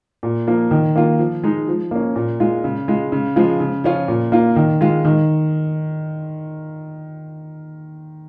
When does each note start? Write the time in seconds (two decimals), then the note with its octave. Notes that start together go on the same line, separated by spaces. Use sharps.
0.23 A#2
0.47 F3 A#3
0.71 D#3
0.96 A#3 F4
1.19 F3
1.44 G#3 D#4
1.68 F3
1.91 A#3 C#4
2.16 A#2
2.40 G#3 F4
2.64 C#3
2.88 G#3 F4
3.12 C#3
3.36 F3 G#3 F4
3.60 C#3
3.84 F3 C#4 F4
4.08 A#2
4.32 A#3 F4
4.56 D#3
4.81 G#3 F4
5.05 D#3